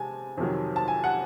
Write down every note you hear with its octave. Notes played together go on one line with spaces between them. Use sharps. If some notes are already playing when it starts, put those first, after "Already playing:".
Already playing: C3 G#3 G#5 A5
F2 C3 D#3 F#3
A5
G#5
F#5